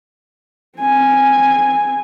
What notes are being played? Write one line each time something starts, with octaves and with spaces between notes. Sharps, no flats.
C4 G#5